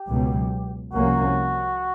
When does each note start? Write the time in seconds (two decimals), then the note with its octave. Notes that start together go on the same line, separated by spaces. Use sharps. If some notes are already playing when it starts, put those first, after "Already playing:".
Already playing: G4
0.09 C#2 B2 F#3
0.93 C2 C3 F3 A#3 C#4 F#4